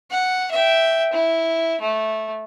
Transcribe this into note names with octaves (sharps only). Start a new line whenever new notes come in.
F#5
E5 G5
E4
A3